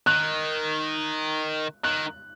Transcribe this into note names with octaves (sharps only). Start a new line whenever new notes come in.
D#3 F#6
D#3 F#6